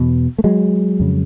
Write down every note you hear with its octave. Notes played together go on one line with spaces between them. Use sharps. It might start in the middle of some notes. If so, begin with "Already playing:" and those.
Already playing: E2 B2
A3
F#3 G#3
F2 C#3